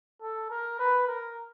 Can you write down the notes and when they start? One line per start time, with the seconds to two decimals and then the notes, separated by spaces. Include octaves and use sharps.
0.22 A4
0.50 A#4
0.79 B4
1.08 A#4